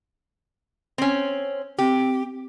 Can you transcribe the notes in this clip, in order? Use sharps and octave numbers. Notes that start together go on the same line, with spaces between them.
C4 C#4
C4 G4